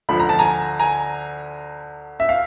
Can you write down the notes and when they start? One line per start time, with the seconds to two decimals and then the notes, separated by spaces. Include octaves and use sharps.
0.09 D2 D3 F3 B5
0.20 A#5
0.29 A5
0.39 G#5 A#5
0.79 G#5 A#5
2.20 E5
2.29 F5